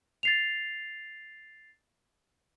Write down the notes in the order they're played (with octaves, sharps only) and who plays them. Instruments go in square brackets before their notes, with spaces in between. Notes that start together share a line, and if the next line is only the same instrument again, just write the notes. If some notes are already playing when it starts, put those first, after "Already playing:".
[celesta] A6 C7 F7